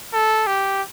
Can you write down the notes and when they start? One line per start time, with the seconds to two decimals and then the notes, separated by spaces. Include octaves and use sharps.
0.14 A4
0.47 G4